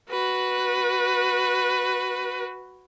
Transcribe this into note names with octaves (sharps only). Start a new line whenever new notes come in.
F#4 B4